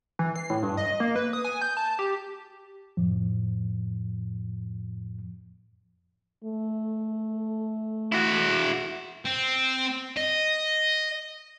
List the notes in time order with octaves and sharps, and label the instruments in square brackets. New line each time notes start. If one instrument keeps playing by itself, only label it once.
[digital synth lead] E3
C7
A2
G2
D#5
A#3
B4
D#6
G#5
G6
A5
G4
[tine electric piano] F2 A2 F3
[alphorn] A3
[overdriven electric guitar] E4 F#4
[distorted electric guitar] C4
D#5